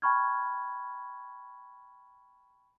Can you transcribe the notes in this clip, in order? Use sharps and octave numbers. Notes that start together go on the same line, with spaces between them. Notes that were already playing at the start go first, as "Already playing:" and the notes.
G5 A5 B5 C#6 F6 G#6